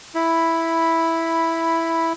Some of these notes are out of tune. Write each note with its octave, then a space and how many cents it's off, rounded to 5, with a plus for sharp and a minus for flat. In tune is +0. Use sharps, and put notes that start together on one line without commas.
E4 +0 B5 -5